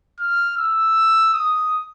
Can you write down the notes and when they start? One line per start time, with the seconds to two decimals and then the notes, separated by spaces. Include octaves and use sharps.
0.20 F6
0.58 E6
1.33 D#6